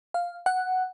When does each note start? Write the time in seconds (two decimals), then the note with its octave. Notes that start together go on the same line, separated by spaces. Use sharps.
0.14 F5
0.46 F#5